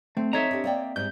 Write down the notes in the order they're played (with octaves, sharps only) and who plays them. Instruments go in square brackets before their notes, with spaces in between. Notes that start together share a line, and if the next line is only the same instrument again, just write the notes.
[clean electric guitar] A3 [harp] C4
[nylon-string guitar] D#4 A4 [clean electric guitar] C#5 A#5 [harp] D#5 E5
[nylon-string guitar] D4 G4
A#3 D5 G5
[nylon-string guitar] G#2 G3 G#3 [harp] G6